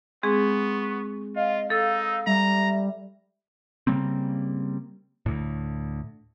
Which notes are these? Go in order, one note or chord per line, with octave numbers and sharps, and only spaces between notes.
G#3 B3 C4 G#4 C#6
F4 D#5 F5
D#4 A4 E6
G3 E5 A#5
C#3 G3 A#3 C4
D2 A2